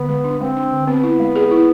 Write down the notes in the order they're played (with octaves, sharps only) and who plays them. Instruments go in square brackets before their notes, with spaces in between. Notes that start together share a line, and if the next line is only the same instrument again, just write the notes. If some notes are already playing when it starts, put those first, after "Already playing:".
Already playing: [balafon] D3 [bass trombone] B3
[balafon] G#3
D4
[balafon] G#3 [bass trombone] C4
[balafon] D4
D3
[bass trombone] B3 [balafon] C4
[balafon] E4
G#3
G#4
E4